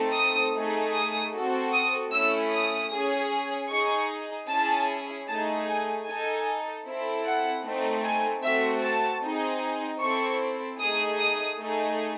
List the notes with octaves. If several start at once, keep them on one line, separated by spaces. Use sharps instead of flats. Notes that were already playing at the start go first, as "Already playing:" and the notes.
Already playing: A3 C4 D#4 A4
D#6
A3 D#4 G#4
D#6
C4 F#4 A4
D#6
A3 C#4 E4 E6
D#6
C#4 G#4
D#4 G#4 C#6
C#4 E4 G#4 A5
A3 D#4 G#4 A5
G#5
D#4 A4 G#5
C4 E4 A4
F#5
A3 C4 D#4
G#5
A3 C4 F#4 E5
A5
C4 D#4 G#4
C4 E4 A4 C#6
A3 D#4 G#4 D#6
D#6
A3 D#4 G#4